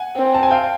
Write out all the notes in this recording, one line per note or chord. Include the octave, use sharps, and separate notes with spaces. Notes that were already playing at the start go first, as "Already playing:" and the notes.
Already playing: F#5 G#5
C4
A5
G#5
F5 G5